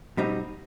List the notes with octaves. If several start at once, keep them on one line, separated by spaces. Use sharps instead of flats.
B2 G3 C4 D#4